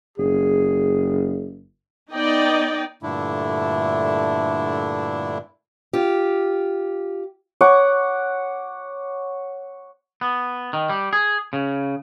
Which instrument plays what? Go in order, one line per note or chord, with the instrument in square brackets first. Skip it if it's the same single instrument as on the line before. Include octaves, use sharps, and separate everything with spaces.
[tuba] F#1 [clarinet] G#4
[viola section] B3 D#4 D5 D#5 G5
[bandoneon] G2 A#2 D3 A3 D4 E4
[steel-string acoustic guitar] F4 G4
[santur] C#5 F#5 D6
[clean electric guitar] B3
D#3
G3
G#4
C#3